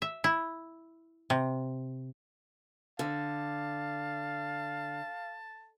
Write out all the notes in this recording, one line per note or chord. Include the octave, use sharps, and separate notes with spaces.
E5
E4
C3
D3 F5 A5